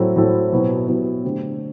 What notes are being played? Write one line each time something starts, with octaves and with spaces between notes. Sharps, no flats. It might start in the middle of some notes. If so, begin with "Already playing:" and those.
Already playing: A2 F#3 C4 E4 A4
A2 F#3 C4 E4 A4
B2 F#3 B3 E4 G4
B2 F#3 B3 E4 G4
D3 A3 C4 G4